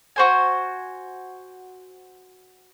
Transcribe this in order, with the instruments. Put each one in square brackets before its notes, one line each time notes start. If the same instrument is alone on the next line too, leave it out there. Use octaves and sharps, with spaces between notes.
[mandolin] F#4 C5 G#5